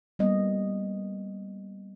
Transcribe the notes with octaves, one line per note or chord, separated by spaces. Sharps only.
G3 A#3 B3 D#5